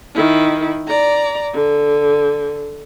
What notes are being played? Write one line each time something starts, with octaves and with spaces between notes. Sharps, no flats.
D#3 E4
D5 A#5
D3